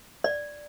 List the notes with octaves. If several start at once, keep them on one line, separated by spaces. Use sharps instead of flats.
D5